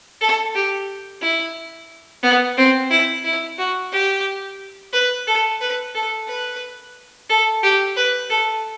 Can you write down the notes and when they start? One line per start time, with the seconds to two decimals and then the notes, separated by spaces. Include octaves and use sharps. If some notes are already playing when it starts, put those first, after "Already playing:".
0.21 A4
0.55 G4
1.22 E4
2.23 B3
2.57 C4
2.91 E4
3.24 E4
3.58 F#4
3.92 G4
4.93 B4
5.27 A4
5.61 B4
5.95 A4
6.28 B4
7.30 A4
7.63 G4
7.97 B4
8.30 A4